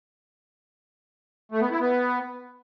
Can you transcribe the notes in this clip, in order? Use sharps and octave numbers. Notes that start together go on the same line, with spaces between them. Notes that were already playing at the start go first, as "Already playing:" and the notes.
A3
B3
E4
B3